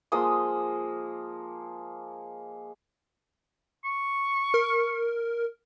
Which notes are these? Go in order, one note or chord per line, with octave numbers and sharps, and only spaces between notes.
F3 G#3 A#3 D#6
C#6
A#4